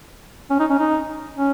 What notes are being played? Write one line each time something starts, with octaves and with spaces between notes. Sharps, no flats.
C#4
D#4
C#4
D#4
C#4